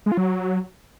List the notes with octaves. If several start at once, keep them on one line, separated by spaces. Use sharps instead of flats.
G#3
F4
F#3